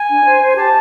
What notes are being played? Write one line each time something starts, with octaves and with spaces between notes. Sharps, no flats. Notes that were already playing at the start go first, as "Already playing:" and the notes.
Already playing: G#5
D4
C5
C5 G#5
G4 A5